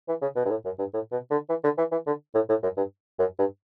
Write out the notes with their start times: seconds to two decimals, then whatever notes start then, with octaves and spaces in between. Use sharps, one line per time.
0.08 E3
0.22 C#3
0.36 B2
0.45 G2
0.50 A2
0.65 F#2
0.79 G2
0.93 A2
1.12 B2
1.31 D3
1.49 E3
1.64 D3
1.78 E3
1.92 E3
2.07 D3
2.35 A2
2.49 A2
2.63 F#2
2.77 G2
3.19 F#2
3.39 G2